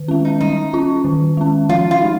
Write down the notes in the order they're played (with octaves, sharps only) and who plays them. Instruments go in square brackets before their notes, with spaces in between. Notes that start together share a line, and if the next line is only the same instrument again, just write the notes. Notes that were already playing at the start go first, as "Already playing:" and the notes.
Already playing: [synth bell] D#3
G#3 C#4
[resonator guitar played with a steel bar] D#4
[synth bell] G3 [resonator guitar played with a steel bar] D#4
[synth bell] C#4 F4
D#3
G#3 C#4
[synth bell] F3 [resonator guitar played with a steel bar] F4
[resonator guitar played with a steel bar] F4
[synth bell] G#3 D#4